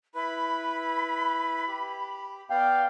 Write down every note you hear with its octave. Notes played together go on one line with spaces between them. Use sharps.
E4 B4 B5
G4
B3 D5 F5 G5